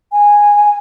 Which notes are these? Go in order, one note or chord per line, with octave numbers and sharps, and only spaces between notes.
G#5